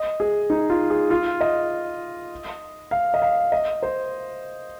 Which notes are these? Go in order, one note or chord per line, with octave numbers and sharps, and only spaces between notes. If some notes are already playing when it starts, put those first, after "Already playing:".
Already playing: D#5
G#4
D#4
F4
G#4
F4
D#5
F5
D#5
F5
D#5
C5